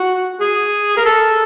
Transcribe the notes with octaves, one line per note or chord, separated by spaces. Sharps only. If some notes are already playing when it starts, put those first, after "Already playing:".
Already playing: F#4
G#4
A#4
A4